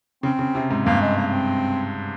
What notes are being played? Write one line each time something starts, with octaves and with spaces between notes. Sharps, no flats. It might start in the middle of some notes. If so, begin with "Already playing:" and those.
C#3 C4
C#3
C3
G#2
G2 A#3
G#3
A#3
A#3
C4